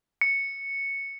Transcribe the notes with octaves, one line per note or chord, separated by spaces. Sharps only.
C#7